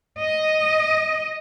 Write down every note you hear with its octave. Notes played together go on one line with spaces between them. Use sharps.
D#5